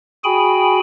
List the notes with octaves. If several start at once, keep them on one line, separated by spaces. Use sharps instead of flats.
F#4 G#4 G5 G#5 B5